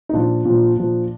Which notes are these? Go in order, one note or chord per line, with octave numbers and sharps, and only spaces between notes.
D#4
A#2 F3 D4 F4
A#2 F3
A#2 F3